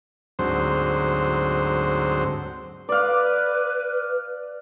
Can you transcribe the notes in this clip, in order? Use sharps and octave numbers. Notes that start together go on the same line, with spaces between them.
D2 G#2 F#3 C4 C5
B4 D5 F5